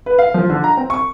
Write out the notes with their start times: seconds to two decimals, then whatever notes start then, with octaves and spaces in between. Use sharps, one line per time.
0.06 B4
0.18 F5
0.34 F3
0.50 D3
0.64 A#5
0.77 C4
0.90 C#6